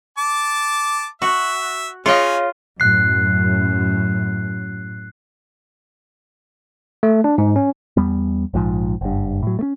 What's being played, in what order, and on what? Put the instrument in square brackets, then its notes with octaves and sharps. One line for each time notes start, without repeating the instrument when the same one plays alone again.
[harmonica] A5 D6
[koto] F#4 [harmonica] E5
[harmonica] C#4 [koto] F4 D#5 [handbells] G#4 C#5 F5
[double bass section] F#2 [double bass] A2 [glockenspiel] F#6 C7
[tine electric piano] A3
D4
G#2
C#4
[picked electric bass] E2 G3 B3
A#1 G#2 F3
F#1 G2
A2 F#3
A3 C#4